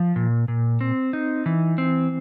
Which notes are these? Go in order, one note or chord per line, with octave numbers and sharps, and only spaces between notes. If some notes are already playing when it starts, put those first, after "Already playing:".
Already playing: F3
A#2
A#2
C4
D#4
E3
C4